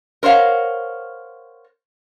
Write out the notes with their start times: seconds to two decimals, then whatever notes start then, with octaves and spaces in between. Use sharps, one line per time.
0.23 A#4 C5 C#5 F5 F#5